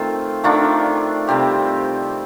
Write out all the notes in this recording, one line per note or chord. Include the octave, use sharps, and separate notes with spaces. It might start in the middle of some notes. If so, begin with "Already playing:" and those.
Already playing: D#3 A3 C4 F4
D#3 A3 D4 F4
C3 G3 C4 G4